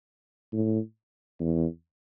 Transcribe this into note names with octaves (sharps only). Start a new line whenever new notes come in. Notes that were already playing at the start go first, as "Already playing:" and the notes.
A2
E2